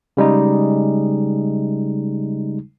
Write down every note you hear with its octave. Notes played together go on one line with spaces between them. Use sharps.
C#3 G3 G#3 D#4